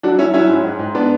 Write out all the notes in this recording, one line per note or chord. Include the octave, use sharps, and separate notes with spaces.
F#3 D4 F#4
F#3 C#4 E4
F#3 C#4 E4
G#2
G#2
G#2
B3 D4